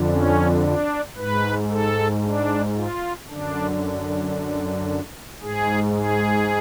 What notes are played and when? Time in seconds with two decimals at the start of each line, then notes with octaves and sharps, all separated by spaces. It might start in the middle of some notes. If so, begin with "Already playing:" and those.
Already playing: F2 D3
0.10 C#4
0.64 D4
1.17 G#2 B4
1.70 A4
2.24 D4
2.76 F4
3.29 F#2 D3 D4
5.42 G#2 G#4
5.96 G#4